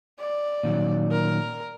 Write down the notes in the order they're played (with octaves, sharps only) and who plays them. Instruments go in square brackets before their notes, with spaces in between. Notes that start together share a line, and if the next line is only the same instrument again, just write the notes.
[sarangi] D5
[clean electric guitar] A#2 D#3 F#3
[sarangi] A#4